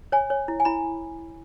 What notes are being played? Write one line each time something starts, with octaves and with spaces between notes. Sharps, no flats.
C#5 G#5
C#5
E4
G#5
E4 B5